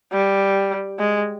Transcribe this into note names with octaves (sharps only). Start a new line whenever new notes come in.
G3
G#3